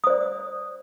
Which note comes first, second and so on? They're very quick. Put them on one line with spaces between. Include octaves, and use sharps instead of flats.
D#6 C5 D5